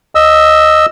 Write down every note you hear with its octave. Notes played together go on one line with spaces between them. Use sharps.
D#5 E6